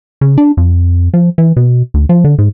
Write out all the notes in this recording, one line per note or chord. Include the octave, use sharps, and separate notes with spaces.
C#3
D4
F2
F3
E3
B2
D2
F3
D3
G#2